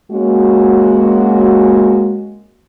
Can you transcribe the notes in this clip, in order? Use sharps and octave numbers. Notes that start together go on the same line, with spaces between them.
G#3 A#3 C#4 F#4